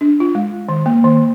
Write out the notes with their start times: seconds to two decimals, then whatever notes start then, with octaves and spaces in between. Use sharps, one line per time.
0.01 D4
0.20 F4
0.35 G#3
0.69 D#3
0.86 A#3
1.04 D#3